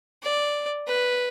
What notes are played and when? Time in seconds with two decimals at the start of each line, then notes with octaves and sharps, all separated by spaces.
0.23 D5
0.87 B4